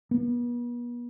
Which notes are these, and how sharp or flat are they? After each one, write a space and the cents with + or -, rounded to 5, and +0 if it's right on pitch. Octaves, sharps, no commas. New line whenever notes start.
B3 -40